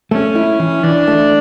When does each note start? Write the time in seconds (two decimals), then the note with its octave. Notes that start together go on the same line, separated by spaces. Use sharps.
0.11 A3 C#4
0.35 E4
0.60 E3
0.83 E3 D4
1.08 A3